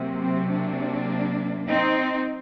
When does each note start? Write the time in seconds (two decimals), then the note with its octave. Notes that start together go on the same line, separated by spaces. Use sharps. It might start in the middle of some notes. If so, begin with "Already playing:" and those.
Already playing: C3 F#3 A#3
0.22 C4
0.51 A#3 D4
1.69 C4 D#4